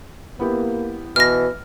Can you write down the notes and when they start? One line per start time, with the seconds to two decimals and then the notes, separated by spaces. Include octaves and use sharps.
0.39 A#3 B3 E4 G4
1.16 B2 E3 F6 A#6